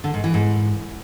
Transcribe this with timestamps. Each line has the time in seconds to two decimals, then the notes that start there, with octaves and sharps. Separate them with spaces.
0.04 D3
0.14 G#2
0.24 E3
0.34 G#2